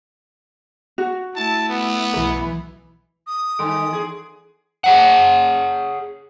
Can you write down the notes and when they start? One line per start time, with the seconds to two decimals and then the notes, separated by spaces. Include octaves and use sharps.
0.98 F#4
1.36 A3 E4 A5
1.69 B3
2.14 B1 E3 B4
3.27 D#6
3.59 G2 D#3 A4 G#5 C6 D7
3.89 E2 G#4
4.84 G#4 C#5 F#5